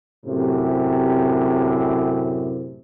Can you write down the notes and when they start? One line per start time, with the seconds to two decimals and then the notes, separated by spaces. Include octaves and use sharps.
0.25 F#2 A2 C3